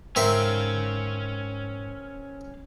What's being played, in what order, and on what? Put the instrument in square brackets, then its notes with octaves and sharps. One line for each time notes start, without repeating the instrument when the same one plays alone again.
[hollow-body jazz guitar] G#2 [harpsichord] C4 A#4 E5 [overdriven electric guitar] C#4 F5